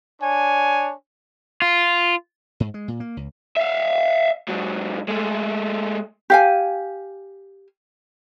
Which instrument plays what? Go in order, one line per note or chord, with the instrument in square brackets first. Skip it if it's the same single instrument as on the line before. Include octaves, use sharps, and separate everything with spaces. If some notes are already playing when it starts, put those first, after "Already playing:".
[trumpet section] D4 C#5 G#5
[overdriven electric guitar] F4
[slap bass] G#2
G#3
A#2
A#3
C#2
[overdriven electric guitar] E5 F5
G#2 F#3
G#3 A3
[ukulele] G4 F5 G#5